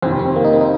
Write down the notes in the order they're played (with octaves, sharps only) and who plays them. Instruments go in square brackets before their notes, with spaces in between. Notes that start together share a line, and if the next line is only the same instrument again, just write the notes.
[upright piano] F2 C3 D#3 [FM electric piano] C4
[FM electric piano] C4
A#3
D#4
C4
D#4